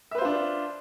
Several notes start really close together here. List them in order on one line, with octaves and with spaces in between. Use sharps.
E5 B4 C5 F4 D4